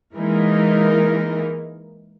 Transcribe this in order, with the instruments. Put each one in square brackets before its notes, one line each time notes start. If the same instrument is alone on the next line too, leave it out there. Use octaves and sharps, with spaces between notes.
[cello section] E3 G#3 [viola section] A#3 D#4 A#4